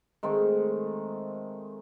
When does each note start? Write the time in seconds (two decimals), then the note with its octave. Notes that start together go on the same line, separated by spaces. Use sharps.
0.23 D#3 G#3 A3 C4